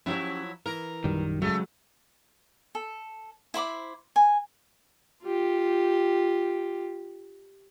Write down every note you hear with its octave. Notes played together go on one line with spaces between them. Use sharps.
F3 F#3 C#4 E4 G4 C#5
E3 A#4
A#1 F#2 D#3 G3
C#3 F#3 G#3 A3
A4
E4 C5 B5 D6
G#5
F4 G4